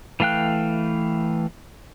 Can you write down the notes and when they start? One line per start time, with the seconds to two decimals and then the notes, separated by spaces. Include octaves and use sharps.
0.20 E3 A3 F5 G5 F#6